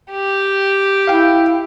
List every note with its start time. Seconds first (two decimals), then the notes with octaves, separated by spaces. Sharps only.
0.11 G4
1.08 E4 F5 G5